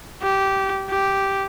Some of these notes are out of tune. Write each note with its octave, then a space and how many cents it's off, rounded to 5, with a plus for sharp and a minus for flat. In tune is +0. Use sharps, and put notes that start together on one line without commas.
G4 -15
G4 -5